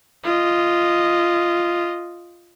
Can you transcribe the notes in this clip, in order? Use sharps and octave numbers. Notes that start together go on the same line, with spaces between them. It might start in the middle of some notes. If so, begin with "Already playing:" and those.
F4 D#5